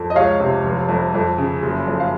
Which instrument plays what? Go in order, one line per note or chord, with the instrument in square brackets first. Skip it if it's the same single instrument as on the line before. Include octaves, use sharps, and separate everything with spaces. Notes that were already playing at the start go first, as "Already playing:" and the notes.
Already playing: [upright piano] F2
D#5
C#2 C#5 F5
C3
F1
F2
F2
C#3
F#1
F2
F5